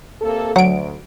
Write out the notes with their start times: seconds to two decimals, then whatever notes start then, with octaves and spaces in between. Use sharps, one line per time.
0.22 C3 A#3 A4
0.56 D2 F#3 F#5 D7